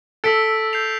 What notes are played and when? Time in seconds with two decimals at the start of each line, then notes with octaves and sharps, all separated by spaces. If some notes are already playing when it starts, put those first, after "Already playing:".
0.24 A4 E6 B6 D7
0.73 G6 C7 F7